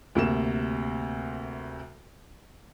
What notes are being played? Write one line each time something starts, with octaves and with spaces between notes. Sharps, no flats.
D2 C3 A#3 E7